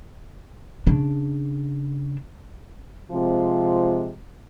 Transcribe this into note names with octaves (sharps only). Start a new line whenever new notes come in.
C#3 D4
C3 F3 G#3 C4 F4